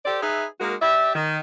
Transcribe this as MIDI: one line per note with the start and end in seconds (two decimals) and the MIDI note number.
0.05 0.21 67
0.05 0.21 69
0.05 0.21 72
0.05 0.21 74
0.22 0.45 63
0.22 0.45 68
0.22 0.45 71
0.22 0.45 76
0.60 0.75 56
0.60 0.75 58
0.60 0.75 63
0.60 0.75 66
0.60 0.75 70
0.82 1.13 67
0.82 1.13 74
0.82 1.13 76
1.15 1.39 51